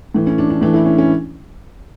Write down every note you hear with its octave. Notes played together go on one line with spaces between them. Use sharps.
A2 E3
C#4
D4
D4
A2 E3 D4
E4
C#4
C#4